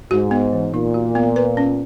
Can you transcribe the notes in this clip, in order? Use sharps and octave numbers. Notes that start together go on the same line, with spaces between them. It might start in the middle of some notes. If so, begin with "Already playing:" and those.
G#2 F#4
B3
E3
A#2 D#4
F#4
B3
B4
C#4